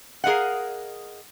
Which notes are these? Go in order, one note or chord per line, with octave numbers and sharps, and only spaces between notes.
G#4 A#4 D#5 F5 F#5